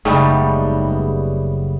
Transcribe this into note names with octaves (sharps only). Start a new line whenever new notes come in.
F#1 G#2 C#3 G3 A3 B3 D#4